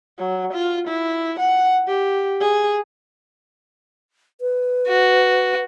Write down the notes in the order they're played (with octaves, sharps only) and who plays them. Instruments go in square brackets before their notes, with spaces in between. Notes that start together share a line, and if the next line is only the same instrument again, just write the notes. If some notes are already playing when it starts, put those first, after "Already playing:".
[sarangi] F#3
F4
E4
F#5
G4
G#4
[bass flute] B4
[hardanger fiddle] F#4